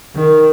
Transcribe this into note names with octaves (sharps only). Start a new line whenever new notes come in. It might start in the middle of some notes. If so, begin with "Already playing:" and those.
D#3